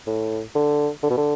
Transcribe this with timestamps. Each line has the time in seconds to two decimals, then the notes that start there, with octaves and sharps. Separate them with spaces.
0.07 A2
0.55 D3
1.03 D3
1.10 B2
1.17 D3